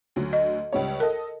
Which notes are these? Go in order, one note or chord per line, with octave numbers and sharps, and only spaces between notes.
D2 F#3
D#5
C#2 G3 C#5
A4 A#4 D#5